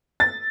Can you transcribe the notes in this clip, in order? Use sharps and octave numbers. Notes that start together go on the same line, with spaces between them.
A6